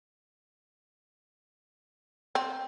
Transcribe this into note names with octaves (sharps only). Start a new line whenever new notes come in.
C4